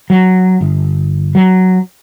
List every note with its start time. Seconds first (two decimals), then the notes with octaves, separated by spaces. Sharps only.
0.10 F#3
0.61 G1
1.35 F#3